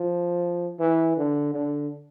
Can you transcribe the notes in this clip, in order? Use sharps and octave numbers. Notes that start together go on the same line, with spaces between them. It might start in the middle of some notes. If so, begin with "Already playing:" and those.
Already playing: F3
E3
D3
D3